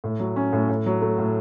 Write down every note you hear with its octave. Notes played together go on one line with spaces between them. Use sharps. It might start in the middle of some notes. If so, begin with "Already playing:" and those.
A2
F#3
C#4
A2
A2
F#3
A3
A2